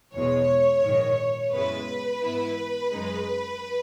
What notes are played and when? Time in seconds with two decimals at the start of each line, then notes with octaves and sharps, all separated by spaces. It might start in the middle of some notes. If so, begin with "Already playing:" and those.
0.14 E2 B2 G#3 C#5
0.83 A#1 G#2 D#3
1.52 F#2 C#3 G#3 B3 E4 B4
2.22 G#2 E3 B3 E4
2.91 F#2 C#3 G#3 D#4